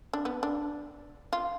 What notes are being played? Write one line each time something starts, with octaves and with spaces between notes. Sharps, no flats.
D4
B3
D4
F4